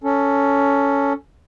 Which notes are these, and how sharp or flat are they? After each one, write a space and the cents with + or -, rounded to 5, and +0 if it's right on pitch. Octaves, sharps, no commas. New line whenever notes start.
C#4 +10 A4 +5